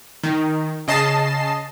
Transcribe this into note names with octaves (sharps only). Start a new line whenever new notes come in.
D#3
C#3 D#5 A5 C7 E7